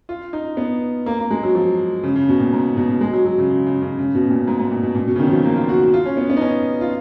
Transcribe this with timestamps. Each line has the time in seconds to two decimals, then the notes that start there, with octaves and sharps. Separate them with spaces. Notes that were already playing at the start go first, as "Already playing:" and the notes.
0.09 F4
0.33 D#4
0.57 B3
1.06 A#3
1.19 A#3
1.31 G#3
1.43 F#3
1.55 F3
2.04 C#3
2.16 C#3
2.29 B2
2.40 A#2
2.53 G#2
2.77 B2
3.01 G#3
3.13 F#3
3.26 F#3
3.38 C#3
3.50 C#3
3.66 C#3
3.82 C#3
3.99 C#3
4.15 B2
4.30 A#2
4.48 G#2
4.59 G#2
4.71 A#2
4.83 B2
4.95 A#2
5.07 B2
5.16 C#3
5.19 D#3
5.27 F#3
5.32 F3
5.44 A#3
5.56 F4
5.69 F#4
5.81 F#4
5.94 F4
6.06 C#4
6.17 B3
6.30 B3
6.37 D#4
6.41 C#4
6.81 F4